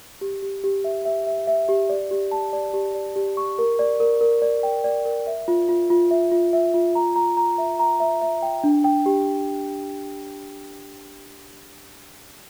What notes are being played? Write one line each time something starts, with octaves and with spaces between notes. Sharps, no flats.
G4
G4
G4
E5
E5
E5
E5
G4
D5
G4
A5
D5
G4
D5
G4
C#6
A#4
D5
A#4
A#4
D5
G5
D5
A#4
E5
F4
F4
F4
E5
F4
E5
F4
A#5
A#5
A#5
E5
A#5
E5
E5
G5
D4
G5
G4